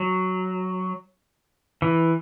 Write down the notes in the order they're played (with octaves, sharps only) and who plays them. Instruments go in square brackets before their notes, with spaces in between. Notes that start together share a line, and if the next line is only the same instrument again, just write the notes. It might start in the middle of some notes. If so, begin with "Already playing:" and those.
Already playing: [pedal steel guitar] F#3
E3